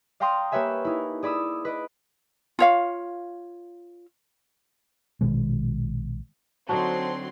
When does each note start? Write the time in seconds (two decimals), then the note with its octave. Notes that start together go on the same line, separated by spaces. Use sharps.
0.20 D5 F5 G5 A#5 C6 D#6
0.52 A#3 G4 B4 C#5 E5 G#5
0.85 D#4 E4
1.23 G#4 D5 B5 D#6 E6
1.65 B4 D#5 D7
2.59 F4 C#5 F5
5.21 A#1 B2 D#3 G#3
6.69 D3 F#3 C4 D#4 F#4 A5 C6